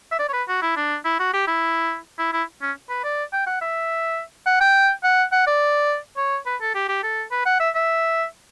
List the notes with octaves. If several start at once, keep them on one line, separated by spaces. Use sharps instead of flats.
E5
D5
C#5
B4
F#4
E4
D4
E4
F#4
G4
E4
E4
E4
C#4
B4
D5
G5
F#5
E5
F#5
G5
F#5
F#5
D5
C#5
B4
A4
G4
G4
A4
B4
F#5
E5
E5